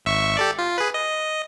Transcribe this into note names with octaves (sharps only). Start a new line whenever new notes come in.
G#1 E5 C#6
G4 A4 D5
F4
G#4 B4
D#5